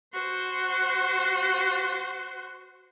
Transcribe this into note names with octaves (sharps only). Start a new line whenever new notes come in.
F#4 C5